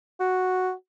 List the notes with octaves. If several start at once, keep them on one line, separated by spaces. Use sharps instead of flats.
F#4